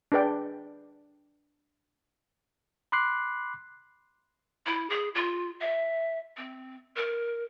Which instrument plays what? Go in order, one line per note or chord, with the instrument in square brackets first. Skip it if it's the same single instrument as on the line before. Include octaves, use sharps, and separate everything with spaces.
[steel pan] D4 G#4 B4 D5 G5
[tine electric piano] B5 C6 D6 F#6 C7
[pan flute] E4
G#4
F4
E5
C4
A#4